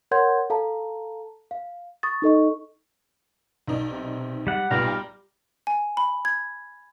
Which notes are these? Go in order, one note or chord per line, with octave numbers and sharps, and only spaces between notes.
A#4 C#5 F#5 C6 G6 G#6
A4 F5 A5 A#5
F5
C#6 D#6 A6
D#4 A4 D#5 C#6
B1 D#4 D5
C3
G3 F#5
B1 A#2 G3 B3 F5 A#5
G5
G#5
B5
G#6